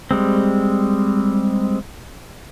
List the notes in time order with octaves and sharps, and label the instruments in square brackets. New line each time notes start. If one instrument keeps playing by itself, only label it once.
[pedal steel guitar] G3 G#3 C4